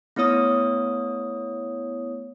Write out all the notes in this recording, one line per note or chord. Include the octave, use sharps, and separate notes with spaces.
A3 B3 E4 C#5 D#6